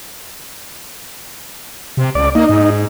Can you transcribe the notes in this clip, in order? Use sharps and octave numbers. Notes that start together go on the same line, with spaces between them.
C3
C#2 D5
A#3 D#4
G#2